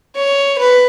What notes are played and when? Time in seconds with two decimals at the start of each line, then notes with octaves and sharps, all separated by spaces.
0.16 C#5
0.58 B4